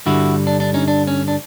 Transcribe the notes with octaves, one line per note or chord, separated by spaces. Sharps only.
G2 D3 G3 E4 F#4
D4
D4
C#4 D#4
D4
C#4
D4